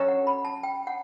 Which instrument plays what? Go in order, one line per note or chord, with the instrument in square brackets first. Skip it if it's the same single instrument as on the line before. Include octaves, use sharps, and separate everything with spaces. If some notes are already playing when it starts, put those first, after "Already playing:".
Already playing: [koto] F#3 C#4 F#4 A4
[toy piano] F#5
B5
A5
G5
F#5